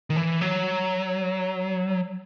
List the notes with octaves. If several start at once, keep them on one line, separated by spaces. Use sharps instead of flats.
D#3
E3
F#3